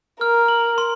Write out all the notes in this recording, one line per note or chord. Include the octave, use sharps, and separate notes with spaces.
A#4 F6
F#7
C6